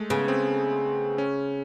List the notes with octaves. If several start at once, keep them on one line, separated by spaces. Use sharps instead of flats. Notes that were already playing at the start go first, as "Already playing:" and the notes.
Already playing: G#3 A3
C#3 B3
C4
C#4